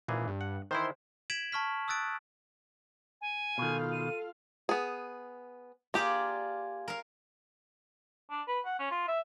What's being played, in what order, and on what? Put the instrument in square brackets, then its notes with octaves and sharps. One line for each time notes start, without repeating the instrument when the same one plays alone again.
[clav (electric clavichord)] G#1 E3 G#4 [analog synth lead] A#2
[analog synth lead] G2
[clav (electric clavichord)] F#5
[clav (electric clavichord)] D#3 E3 E4 [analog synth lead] C5
[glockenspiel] G#6 B6 D7 E7 F#7
A5 C#6 F6 B6
D#6 E6 F#6 A6 D7
[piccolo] G#5
[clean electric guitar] B2 D#3 [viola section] F4 A4 F5
[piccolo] D#7
[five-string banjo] B3 G#4
[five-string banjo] A#3 G4 [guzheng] F4 G#4 D5
[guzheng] A#4 F5
[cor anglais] D4
B4
F#5
C#4
F4
E5